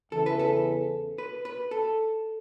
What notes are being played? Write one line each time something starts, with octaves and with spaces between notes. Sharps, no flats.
E2 C#3 E3 A4
B4
A4
B4
B4
A4